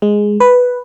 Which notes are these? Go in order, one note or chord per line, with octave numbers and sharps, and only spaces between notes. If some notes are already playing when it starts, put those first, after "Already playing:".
G#3
B4